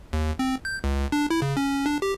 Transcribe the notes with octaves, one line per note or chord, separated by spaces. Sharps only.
D#2
C4
G6
C#2
D4
E4
C#3
C#4
D4
G4